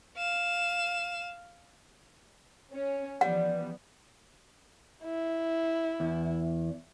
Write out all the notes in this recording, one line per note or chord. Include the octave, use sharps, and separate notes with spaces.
F5 E7
C#4
E3 F3 G3 B3 F#5
E4
E2